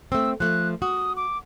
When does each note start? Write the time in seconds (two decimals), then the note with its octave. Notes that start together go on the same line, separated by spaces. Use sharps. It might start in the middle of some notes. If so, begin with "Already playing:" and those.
0.12 A3 C4 E6
0.40 F3 A3 F#6
0.82 F#4 D#6
1.16 D6